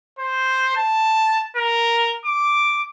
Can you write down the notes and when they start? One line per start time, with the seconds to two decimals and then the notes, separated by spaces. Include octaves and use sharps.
0.19 C5
0.77 A5
1.56 A#4
2.25 D6